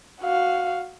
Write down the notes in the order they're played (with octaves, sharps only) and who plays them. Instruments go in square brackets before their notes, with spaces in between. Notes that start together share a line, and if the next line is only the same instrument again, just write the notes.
[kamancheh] F#4 F5